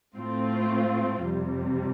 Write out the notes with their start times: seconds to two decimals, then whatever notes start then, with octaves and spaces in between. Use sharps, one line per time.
0.17 A2 A3 C4 F4
1.25 F2 C3 G3